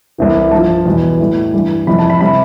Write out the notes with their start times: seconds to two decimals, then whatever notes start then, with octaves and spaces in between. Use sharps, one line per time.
0.18 C2 C3 E3
0.51 G2 F3 A5
0.85 E2 B2 G3
1.20 A2 G3
1.54 G2 E3 G3
1.87 F2 C3 E3 G3 B5
1.99 A5
2.10 B5
2.21 C3 G3 B5